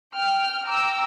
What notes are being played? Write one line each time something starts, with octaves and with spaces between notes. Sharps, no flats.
G5 F6
G5 A#5 D6 E6